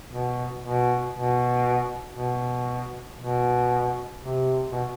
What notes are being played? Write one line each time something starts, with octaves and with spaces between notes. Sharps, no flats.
B2
B2
B2
B2
B2
C3
B2